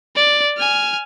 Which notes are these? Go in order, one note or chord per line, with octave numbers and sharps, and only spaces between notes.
D5
G#5 F6